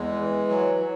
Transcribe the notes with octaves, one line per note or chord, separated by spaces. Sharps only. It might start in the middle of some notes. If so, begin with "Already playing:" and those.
Already playing: E2 G#3
E3
F#3
F#3